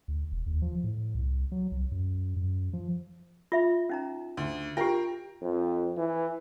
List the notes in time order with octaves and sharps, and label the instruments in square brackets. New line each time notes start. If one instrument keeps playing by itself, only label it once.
[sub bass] D2
E1
D#2
F3
A2
C2
F#3
C2
F#2
F#2
F3
[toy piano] F4 E5 B5
C#4 D#4 A#5
[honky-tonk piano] D2
[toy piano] F4 G4 [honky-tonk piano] A#4 G5
[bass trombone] F2
E3